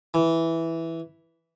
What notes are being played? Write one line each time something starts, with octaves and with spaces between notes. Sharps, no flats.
E3